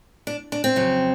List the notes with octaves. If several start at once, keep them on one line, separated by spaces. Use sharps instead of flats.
D4
D4
C4
F2 C#3 F#3